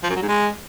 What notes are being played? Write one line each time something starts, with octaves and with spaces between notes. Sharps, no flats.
F3
F#2
F#3
G#2
G#3